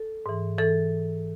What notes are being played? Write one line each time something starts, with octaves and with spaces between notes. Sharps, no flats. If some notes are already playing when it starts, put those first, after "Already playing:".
Already playing: A4
G#2 E3
E3 A4